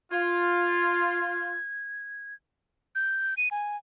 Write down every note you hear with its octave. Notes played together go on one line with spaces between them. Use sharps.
F4 G#6
G6
D#7
G#5